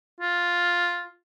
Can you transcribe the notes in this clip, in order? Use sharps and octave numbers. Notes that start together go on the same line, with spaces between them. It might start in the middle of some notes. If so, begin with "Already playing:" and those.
F4